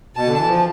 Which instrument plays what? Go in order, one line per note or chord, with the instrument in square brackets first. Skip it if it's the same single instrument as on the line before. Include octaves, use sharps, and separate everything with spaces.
[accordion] B2 [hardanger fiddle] A5
[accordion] D3
E3
F3